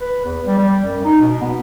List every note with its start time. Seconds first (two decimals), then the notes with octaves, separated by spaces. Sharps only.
0.01 B4
0.25 E2
0.46 G3
0.58 G3
0.85 F#2
1.04 D#4
1.20 B2
1.41 B3